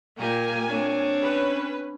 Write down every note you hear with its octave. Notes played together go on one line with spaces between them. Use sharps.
A#2 A#3 G4 G#5
C4 D4 C#5
C#4 B4